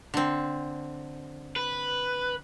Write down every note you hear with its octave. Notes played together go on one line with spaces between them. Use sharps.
D3 C4
B4